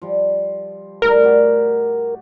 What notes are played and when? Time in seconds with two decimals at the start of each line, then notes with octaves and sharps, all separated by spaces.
0.02 F3 G3
1.02 A2 G3 A#4
1.24 F#4 G4 D5